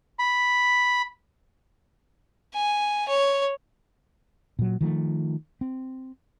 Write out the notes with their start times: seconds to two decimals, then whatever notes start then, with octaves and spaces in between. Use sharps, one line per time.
0.19 B5
2.54 G#5
3.08 C#5
4.59 A#2 F#3
4.81 D#3 F3 A3
5.61 C4